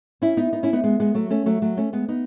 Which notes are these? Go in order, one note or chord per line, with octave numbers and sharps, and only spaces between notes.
C#4 E4
B3 D#4
B3 D#4
C#4 E4
B3 D#4
G#3 B3
G#3 B3
F#3 A3
A3 C#4
F#3 A3
F#3 A3
A3 C#4
G#3 B3
B3 D#4